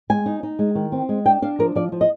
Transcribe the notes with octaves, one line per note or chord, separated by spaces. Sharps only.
G#3 G#5
D#4
D#4
G#3
D#3
C4
G#3
D4 G5
D4 F5
F3 A#4
F3 D5
F3
D#5